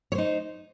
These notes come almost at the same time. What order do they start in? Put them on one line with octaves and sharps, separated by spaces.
C#5 C5 D#4